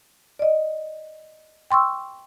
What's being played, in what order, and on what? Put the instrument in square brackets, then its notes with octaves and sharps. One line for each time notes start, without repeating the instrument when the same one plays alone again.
[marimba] D5 D#5
G5 C6 C#6 E6